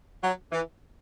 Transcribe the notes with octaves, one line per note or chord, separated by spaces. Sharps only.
F#3
E3